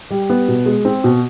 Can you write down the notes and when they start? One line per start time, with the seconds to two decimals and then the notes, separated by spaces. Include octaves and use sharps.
0.10 G3
0.30 B3
0.48 B2
0.66 G#3
0.85 C4
1.04 B2